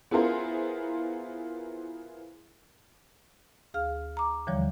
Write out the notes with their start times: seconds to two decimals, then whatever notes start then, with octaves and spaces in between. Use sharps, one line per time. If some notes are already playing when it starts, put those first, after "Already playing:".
0.11 B3 E4 F4 G#4 A#4 C5
3.74 D2 G#4 F5 F6
4.17 A#5 D6
4.47 D#2 D3 E3 F3 G3 C#5